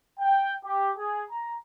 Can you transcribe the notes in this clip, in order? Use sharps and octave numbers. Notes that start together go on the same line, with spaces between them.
G5
G4
G#4
A#5